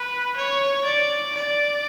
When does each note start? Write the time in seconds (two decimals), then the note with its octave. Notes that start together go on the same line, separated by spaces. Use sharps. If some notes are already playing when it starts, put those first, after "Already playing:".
Already playing: B4
0.36 C#5
0.85 D5
1.35 D5